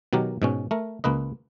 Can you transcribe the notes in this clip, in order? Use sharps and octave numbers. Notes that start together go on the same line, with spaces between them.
B2 D#3 F#3 G4 A#4
G#2 B2 C#4
A3 A#4
C#2 A#3 B4 D#5